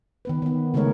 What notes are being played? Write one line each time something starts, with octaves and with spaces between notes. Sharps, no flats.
D#3 B3 B4
D#3 B3
C#3 G#3 A3 D#4 A#4 C#5